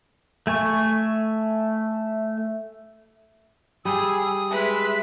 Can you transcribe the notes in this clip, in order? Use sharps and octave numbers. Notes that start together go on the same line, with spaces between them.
A3 G#5 C#6
G3 G#4 G5 D#6 E6
G#3 B4 E5